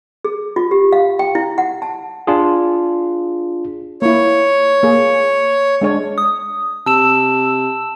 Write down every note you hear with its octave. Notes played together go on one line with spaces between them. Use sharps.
G#4
F4
G4
F5
G5
E4
F#5
A5
D4 F4 G#4
A#3 E4 C#5
A#3 G#4
G#3 D4 C#5
D#6
C3 A5 E6 E7